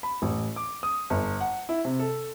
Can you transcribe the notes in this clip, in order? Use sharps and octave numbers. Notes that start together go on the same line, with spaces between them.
B5
A1
D6
D#6
G1
F#5
E4
C3
A4